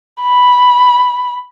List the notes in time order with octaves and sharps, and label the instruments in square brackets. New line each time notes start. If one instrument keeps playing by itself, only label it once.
[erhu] B5